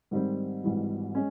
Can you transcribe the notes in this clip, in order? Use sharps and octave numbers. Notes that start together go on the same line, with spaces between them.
G#2 D#3 G3 C4
G#1 G#2 E3 G3
G#3 C#4